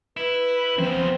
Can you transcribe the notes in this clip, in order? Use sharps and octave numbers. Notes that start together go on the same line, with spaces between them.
E4 B4
C#3 F3 B3 C4 C5